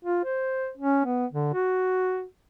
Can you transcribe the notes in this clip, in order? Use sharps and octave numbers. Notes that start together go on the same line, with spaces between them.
F4
C5
C#4
B3
D3
F#4